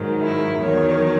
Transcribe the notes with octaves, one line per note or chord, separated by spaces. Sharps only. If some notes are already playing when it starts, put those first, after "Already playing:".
Already playing: G#2 D#3 F#3
E4
E2 D#3 F#3 C#5